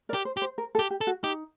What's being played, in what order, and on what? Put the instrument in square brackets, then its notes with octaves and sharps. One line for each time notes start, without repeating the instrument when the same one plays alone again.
[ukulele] A#4 D5
[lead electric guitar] G4
[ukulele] C5
[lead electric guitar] G4
[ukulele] C5
A#4
A4
[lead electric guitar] G4
[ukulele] G4
[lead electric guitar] A4
[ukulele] F#4
[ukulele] D#4 [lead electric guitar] G4